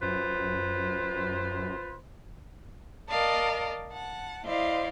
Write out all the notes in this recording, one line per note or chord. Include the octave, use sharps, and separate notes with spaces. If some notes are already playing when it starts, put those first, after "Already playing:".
F#2 F4 B4 C5
A#4 D5 D#5 F5 A5
F#5 A5
E4 C5 D5 D#5 F5